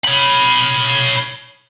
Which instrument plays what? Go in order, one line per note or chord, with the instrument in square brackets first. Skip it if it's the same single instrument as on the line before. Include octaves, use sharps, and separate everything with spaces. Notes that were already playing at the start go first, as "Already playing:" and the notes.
[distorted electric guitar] C#5 B5